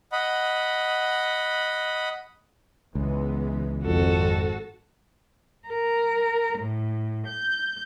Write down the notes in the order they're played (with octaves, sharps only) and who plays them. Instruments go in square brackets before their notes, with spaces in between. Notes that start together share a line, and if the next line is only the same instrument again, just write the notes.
[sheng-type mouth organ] D#5 F#5 B5
[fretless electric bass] C#2 [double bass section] E3 G#3 B3
[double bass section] G#1 [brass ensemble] F2 [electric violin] F#4 A4
[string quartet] A#4
A2
G6